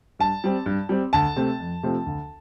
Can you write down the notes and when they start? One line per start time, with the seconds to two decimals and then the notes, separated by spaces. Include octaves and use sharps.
0.19 G2 A5
0.44 G3 C4
0.66 G2
0.89 G3 C4
1.13 D2 A5
1.36 C3 A3 C4
1.60 F2
1.83 C3 F3 A3 C4
2.06 D2